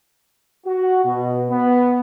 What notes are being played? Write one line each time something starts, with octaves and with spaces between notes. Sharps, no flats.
F#4
B2
B3